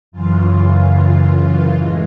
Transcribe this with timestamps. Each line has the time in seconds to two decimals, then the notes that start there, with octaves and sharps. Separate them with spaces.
0.12 F#2 C#3 E3 F4
1.73 A2 E3 G#3